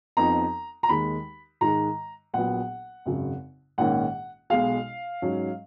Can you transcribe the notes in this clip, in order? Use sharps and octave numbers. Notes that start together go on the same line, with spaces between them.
F2 F3 B3 D#4 A#5
A#5
D#2 D#3 G#3 B5
G#2 D#3 G#3 A#5
A#1 A#2 F#3 B3 F#5
G#1 F#2 C#3
A#1 G#2 D#3 A#3 C#4 F#5
B1 B2 G#3 F5
G#2 F#3 C#4